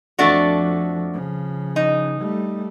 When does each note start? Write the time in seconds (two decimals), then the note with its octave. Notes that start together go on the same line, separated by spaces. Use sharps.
0.19 F2 F3 A3 D4 F#4
1.13 C#3 F3
1.76 D#4
2.19 G3 A3